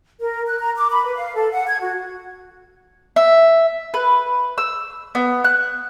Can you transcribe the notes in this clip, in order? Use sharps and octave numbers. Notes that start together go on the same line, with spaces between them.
A#4
F#6
A#5
D6
B5
B4
F5
A4
F#5
G#6
F#4
E5
B4
E6
B3
F#6